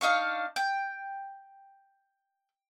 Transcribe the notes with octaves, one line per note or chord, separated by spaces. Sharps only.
D4 D#4 F5 C#6
G5